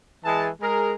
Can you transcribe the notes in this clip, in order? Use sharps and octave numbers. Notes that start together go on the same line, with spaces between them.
E3 G#3 G#4 A5
G#3 G#4 A#4